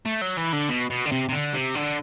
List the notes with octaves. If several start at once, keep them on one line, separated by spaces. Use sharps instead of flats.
A3
F#3
E3
D3
B2
B2
D3
C3
C3
D3
C3
D3